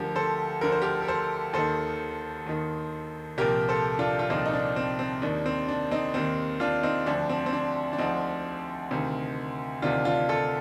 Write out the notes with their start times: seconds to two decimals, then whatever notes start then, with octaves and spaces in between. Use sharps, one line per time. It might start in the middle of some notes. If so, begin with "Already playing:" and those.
Already playing: D2 D3 F3 G4 A#4
0.16 A4 C5
0.61 D2 D3 F3 A#4
0.72 C5
0.82 G4 A#4
1.02 A#4
1.08 A4 C5
1.53 D#2 D#3 A4 C5
2.46 D#2 D#3
3.38 C2 A#2 F3 G4 A#4
3.69 A4 C5
3.99 D4 F4
4.19 F4
4.30 C2 A#2 F3 C4 D#4
4.46 D#4
4.53 D4
4.76 C4
4.99 C4
5.22 D#2 D#3 D4
5.46 C4
5.68 D4
5.91 C4 D#4
6.14 D#2 D#3 C4
6.60 D4 F4
6.83 C4 D#4
7.06 D2 D3 F3 D4
7.29 C4
7.46 C4
7.53 D4
7.93 D4
7.98 D2 D3 F3 C4 D#4
8.91 D2 C3 D#3
9.82 D2 C3 D#3 D4 F4
10.05 D4 F4
10.29 F4 A4